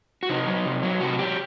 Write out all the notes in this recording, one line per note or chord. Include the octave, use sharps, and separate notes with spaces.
F#4
C3 D#4
F#3
C3
F#3
C3 F#4
F#3 G4